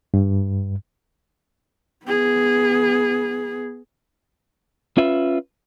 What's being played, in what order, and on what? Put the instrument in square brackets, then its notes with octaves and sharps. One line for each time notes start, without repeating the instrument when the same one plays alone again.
[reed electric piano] G2
[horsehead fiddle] B3 G#4
[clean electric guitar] C#4 F4 B4 E5